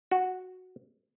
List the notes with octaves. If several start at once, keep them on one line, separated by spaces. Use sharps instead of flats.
F#4